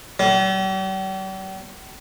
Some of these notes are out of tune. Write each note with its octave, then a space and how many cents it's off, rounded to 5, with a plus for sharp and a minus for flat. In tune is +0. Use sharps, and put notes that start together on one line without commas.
G3 -45